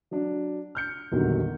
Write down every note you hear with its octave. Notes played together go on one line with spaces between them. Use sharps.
F#3 D4
F6 G6 C#7
A#1 E2 D3 D#3 F#3 G3